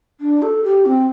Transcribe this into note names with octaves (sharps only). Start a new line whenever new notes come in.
D4
A4
G4
C4